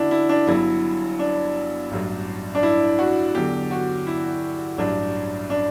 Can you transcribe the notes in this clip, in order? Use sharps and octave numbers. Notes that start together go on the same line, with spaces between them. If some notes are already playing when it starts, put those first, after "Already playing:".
Already playing: E2 D3 D4 E4 F#4
E4
D4
G1 G2 F#3 E4
D4
A1 G2 F#3
D4
E4
F#4
E2 D3 F#3 G4
F#4
E4
A1 G2 F#3 D4
D4